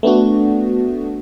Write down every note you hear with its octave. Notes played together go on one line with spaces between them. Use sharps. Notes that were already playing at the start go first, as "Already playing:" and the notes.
A3 B3 D4 F#4